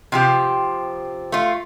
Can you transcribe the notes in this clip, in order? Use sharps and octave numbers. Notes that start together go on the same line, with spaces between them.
C3 F3 G4
A3 F4